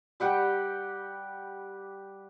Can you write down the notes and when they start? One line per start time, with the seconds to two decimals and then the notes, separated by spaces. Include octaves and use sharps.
0.20 G3 G4 F#5 G5